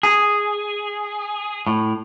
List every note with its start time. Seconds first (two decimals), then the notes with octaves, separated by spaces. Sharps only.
0.03 G#4
1.67 A2